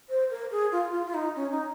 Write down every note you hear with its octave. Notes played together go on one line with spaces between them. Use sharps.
C5
A#4
G#4
F4
F4
F4
D#4
C#4
D#4